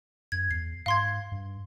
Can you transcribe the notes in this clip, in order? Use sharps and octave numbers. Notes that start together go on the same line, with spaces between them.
F#2 G#6
E2 C7
G#2 F5 C6 G#6
G2